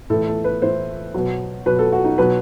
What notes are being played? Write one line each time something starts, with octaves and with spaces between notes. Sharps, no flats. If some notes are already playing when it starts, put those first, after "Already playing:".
A2 E3 A4
A4
B4
A2 E3 C5
B2 F#3
B2 F#3 B4
A4
F#4
D#4
B2 F#3 B4